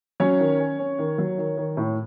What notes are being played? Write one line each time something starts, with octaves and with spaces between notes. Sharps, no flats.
F#3 C#4 C#5
D#3
C#4
C#4
D#3
F#3
D#3
D#3
A2